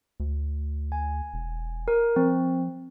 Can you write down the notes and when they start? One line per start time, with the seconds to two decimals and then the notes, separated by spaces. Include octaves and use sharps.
0.20 D2
0.92 G#5
1.34 E1
1.88 A#4
2.16 F3 C4